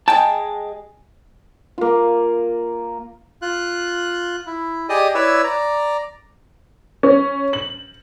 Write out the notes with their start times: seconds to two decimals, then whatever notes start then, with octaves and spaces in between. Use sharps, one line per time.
0.08 G#3 G#4 G5 A5
1.78 A#3 F4
3.42 F4 F#6
4.46 E4
4.89 G4 G#4 D5 D#5 D#6
5.15 E4 B4 C#5 D5 E6
5.44 D5 A#5
7.03 C#4
7.53 F#7